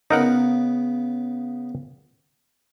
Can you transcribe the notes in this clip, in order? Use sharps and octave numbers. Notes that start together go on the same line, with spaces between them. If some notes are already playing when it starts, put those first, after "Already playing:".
C#3 B3 D#4 A#4 F#5